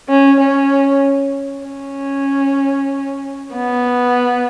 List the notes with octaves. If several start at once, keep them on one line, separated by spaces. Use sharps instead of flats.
C#4
C#4
C#4
B3